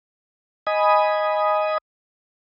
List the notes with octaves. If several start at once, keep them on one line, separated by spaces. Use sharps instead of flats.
D#5 G#5 B5 D#6